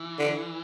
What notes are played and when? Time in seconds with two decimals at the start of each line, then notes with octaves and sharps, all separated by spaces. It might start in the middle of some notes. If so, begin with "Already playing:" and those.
Already playing: E3
0.19 D3